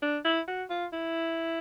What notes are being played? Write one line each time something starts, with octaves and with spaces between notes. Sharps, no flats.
D4
E4
F#4
F4
E4